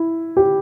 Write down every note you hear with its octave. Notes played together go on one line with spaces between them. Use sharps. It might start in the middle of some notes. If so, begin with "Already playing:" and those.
Already playing: E4
G4